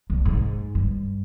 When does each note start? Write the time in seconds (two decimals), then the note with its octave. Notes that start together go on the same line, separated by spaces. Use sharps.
0.10 C2
0.25 G#2
0.75 G2